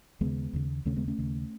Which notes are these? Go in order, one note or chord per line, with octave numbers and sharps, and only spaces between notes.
D#2 C#3 G#3 B3
D#2 C#3
D#2 C#3 A3 C#4
G#3 B3
A3 C#4
D#2 C#3